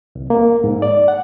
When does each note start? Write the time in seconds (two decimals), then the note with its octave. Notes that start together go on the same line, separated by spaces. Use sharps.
0.15 C2
0.30 A#3
0.64 G#2
0.82 D5
1.08 F#5